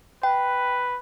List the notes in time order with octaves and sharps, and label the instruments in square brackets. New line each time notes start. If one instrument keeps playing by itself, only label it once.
[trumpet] B4 [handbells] G5